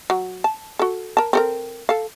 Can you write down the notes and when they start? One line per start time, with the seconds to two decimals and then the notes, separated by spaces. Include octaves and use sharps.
0.10 F#3
0.44 A5
0.79 F#4 A4
1.17 A#4 A5
1.33 C4 A4 A#4
1.89 A4 F5